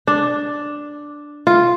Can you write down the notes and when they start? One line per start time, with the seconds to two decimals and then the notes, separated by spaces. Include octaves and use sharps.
0.07 D4
1.47 F4